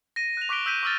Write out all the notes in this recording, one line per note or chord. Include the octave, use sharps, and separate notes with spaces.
A#6 D#7
F#6 F7
C#6 D6 F#6 B6 D7 G7
E6 G6 B6 D#7
C#6 D6 E6 F6 A6